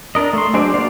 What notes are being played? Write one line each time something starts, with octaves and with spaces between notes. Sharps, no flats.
D4 A#4 D#5
A3 C6
F#3 G#3 D4 C5 D5
A#3 D4 F#4 D5 F5